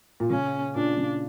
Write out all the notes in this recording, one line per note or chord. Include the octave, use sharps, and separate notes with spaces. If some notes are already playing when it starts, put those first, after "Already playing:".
A#2
C#3 C#4
A#2 D4
C#3